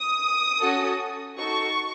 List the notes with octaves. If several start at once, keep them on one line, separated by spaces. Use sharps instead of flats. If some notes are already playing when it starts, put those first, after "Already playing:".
Already playing: D#6
C#4 F#4 A4
D#4 F#4 A4 C#6